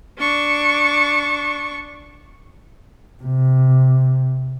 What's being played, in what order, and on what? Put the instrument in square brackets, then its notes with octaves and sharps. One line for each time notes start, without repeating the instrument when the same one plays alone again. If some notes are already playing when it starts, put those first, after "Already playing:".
[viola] D4 C#6
[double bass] C3